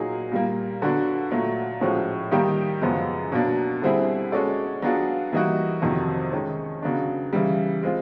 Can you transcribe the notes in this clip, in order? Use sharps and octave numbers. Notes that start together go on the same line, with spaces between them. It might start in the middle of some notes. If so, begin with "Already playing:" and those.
Already playing: A#2 F#3 A#3 D#4 G#4
A#2 G3 A#3
D3 F#3 B3 D4 F#4
A#2 F#3 A3
A2 F3 G#3 C#4 F#4
D#3 G3 A#3 D#4 G4
F#2 C#3 F3 G#3 B3
B2 F#3 A#3 D4
D3 G3 C4 E4 G#4
G#3 C#4 F#4 A4 D5
F#3 B3 D4 F4 G#4
E3 G3 A#3 D#4 F#4
F2 C3 D#3 F#3
D#3 G#3 C#4
C#3 F#3 B3 D4
C#3 E3 G3
G#3 C4 F4